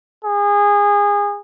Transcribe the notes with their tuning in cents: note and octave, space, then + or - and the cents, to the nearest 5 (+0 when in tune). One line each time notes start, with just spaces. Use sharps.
G#4 -25